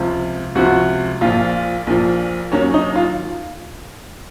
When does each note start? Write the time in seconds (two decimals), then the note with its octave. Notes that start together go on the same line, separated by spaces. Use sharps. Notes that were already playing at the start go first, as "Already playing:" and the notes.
Already playing: C#2 C3 F3
0.55 C#2 C3 F3 F#4
1.21 A#1 A#2 F3 F4
1.87 A#1 A#2 F3
2.52 D#2 D#3 F#3 C#4
2.74 D#4
2.96 F4